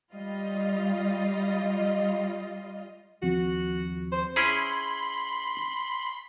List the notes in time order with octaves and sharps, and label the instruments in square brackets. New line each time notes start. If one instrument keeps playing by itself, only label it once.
[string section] G3 F4 D#5
[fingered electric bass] D#2 F3 C4 [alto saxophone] F#4
[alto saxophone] C5
[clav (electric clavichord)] C#4 E4 G#4 [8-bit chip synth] B5 C6